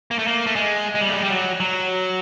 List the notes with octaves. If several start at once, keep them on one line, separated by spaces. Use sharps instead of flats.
A#3
A3
A#3
A3
G#3
G#3
G3
A3
G#3
G3
F#3
F#3